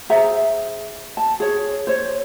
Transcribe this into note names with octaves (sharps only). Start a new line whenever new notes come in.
G#4 C5 E5 A#5
A5
G#4 C#5
C5 C#5